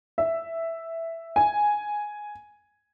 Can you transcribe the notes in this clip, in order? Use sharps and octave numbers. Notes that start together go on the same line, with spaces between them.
E5
G#5